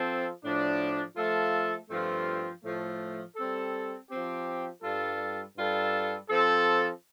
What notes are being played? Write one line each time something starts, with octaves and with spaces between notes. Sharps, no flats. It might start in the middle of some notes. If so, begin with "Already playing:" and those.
Already playing: F3 C4 A4
A2 F3 D4
F3 A3 F4 A4
G2 F3 A3 C4 F4
A2 F3 A3
G3 C4 A4
F3 C4 G4
G2 G3 F4 A4
G2 G3 F4 A4
F3 C4 A4